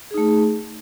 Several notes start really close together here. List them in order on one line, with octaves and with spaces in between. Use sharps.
G#4 D#4 A3